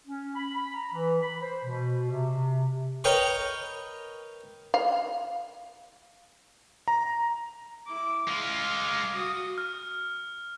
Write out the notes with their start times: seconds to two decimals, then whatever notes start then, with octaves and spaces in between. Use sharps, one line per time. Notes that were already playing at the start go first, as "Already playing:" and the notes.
0.06 C#4
0.35 B5
0.54 B5
0.74 A#5
0.93 E3
1.22 B5
1.42 C5
1.65 B2
2.11 C3
3.04 A#4 B4 C#5 D#5 G5
4.74 F5
6.88 A#5
7.86 E4 D6
8.28 G#3 F4 F5 D6
9.13 F#4 D#6
9.58 F6